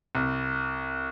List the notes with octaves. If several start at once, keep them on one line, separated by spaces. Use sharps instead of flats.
C2